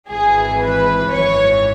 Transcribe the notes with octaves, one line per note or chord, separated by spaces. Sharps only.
G#1 G#2 E3 G#4
B4
G#1 F#2 E3 C#5